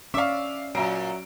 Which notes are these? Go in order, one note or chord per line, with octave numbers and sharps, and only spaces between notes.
C#4 D5 E5 F5 C#6 D6
A#2 F#3 E5 A#5 D7